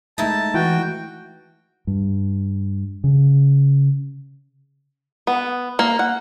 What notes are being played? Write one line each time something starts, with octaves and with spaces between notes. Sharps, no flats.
G#3 A3 D#4 E4 A5
E3 F#4 G5
G2
C#3
B3
A#3
F#5